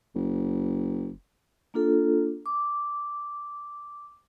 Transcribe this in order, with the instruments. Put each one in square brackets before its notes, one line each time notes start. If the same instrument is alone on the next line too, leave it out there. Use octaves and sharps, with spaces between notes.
[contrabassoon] F#1
[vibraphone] A#3 D4 F4 A4
D6